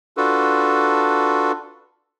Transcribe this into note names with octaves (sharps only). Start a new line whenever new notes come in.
D4 F4 F#4 A4 B4